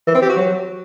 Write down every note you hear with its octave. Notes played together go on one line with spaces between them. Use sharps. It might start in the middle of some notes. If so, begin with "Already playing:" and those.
E3
C4
G4
F#4
F#3